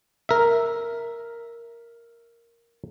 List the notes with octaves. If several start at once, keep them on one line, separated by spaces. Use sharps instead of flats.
A#4 E5